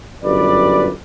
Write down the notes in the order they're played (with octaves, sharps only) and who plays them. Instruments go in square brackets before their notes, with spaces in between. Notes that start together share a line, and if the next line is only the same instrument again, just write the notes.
[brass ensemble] G1 F#2 G4 B4 D5